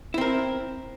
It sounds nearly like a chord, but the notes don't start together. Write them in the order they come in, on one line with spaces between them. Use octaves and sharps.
E4 C4 A#4